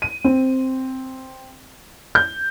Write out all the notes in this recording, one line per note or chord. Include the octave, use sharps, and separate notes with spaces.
D#7
C4
G6